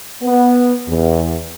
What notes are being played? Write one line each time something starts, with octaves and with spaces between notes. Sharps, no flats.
B3
E2